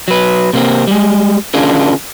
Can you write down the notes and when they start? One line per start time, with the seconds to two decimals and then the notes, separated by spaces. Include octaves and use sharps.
0.08 F#3 B4
0.53 C3 A#3 C4
0.87 G3 G#3
1.54 D3 C#4 D4 F4 G#4 A#4